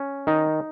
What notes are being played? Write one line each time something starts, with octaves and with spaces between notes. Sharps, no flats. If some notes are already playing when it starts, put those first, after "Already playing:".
Already playing: C#4
D#3 D#4